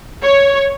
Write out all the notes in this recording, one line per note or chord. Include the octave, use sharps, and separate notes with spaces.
C#5